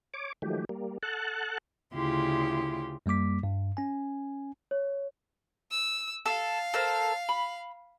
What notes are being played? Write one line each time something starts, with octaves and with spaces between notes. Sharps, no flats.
C#5 D6
D#3 F3 F#3 G#3 A3 G4
G3 A#3
A4 F#5 A5 F#6
D2 C#3 E4 F4 G4 C6
F#2 G3 A#3 D6 B6
G2
C#4 G#5
C#5
E6
A4 F5
A4 A#4 C5
B5